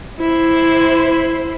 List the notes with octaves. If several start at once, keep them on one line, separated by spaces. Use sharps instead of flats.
E4 C5